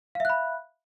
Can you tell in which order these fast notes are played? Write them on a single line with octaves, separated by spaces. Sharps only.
F5 E5 F#6 B5